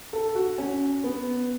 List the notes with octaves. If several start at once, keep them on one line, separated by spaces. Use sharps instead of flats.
A4
F#4
C#4
B3